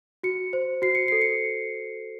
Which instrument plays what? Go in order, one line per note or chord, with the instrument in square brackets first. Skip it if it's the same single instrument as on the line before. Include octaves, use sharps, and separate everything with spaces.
[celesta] F#4 C#7
C5
F#4 C7
C#7
A4 C7
C#7